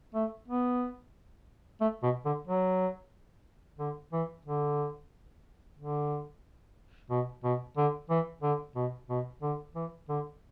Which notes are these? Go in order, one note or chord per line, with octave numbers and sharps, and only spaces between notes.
A3
B3
A3
B2
D3
F#3
D3
E3
D3
D3
B2
B2
D3
E3
D3
B2
B2
D3
E3
D3